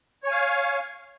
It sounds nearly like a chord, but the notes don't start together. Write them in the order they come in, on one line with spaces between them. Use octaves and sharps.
C#5 G#5 F5